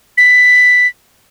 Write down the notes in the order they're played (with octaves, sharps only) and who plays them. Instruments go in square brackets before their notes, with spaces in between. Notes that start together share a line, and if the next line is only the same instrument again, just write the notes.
[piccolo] B6